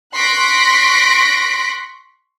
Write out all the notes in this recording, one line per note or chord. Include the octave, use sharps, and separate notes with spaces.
C6 C#6 F#6 A#6 B6 D7